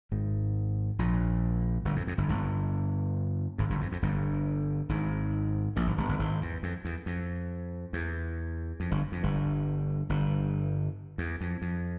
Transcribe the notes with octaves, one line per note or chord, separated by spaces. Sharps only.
G#1 G#2
A#1 A#2
G1 G2
F2
F2
G1 G2
G1 G2
G#1 G#2
G1 G2
F2
F2
G1 G2
G#1 G#2
A#1 A#2
G#1 G#2
G1 G2
G1 G2
G#1 G#2
E2
F2
E2
F2
E2
F2
G1 G2
F2
G1 G2
G1 G2
E2
F2
F2